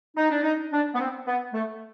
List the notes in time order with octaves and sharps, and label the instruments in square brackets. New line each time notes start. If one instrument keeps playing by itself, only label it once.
[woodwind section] D#4
D4
D#4
D4
B3
C4
B3
A3